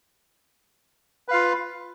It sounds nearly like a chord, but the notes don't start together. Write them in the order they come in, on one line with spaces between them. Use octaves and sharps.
B4 F5 F4